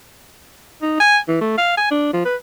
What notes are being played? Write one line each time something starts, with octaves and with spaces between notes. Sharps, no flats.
D#4
G#5
E3
A3
F5
G#5
D4
F3
B4